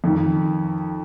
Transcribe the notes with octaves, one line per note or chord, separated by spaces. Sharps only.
F2 D#3